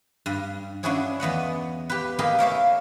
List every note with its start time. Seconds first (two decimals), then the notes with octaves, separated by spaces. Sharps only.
0.26 G2
0.83 C#4 D4 E4 F#4 G#4 C#5
1.20 E2 B3 D#5 F#5
1.90 G4 B4
2.19 A#3 D#4 G4 G#4 A#4 B4
2.39 A#4 C#5 E5 F5